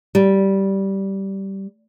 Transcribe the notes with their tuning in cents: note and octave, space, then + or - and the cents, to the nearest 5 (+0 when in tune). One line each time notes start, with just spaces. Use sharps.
G3 -10